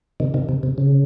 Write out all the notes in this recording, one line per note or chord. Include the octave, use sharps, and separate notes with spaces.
C3 D#3
C3 D#3
C3
C3
C#3